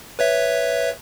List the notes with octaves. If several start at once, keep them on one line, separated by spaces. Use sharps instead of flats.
B4 C#5 E5